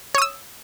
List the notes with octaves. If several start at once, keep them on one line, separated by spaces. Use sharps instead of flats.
C#5 D#6 E6